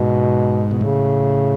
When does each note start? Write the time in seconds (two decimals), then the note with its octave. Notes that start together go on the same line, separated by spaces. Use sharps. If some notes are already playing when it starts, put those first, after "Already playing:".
Already playing: G#2 B2
0.71 B2
0.81 A2 C#3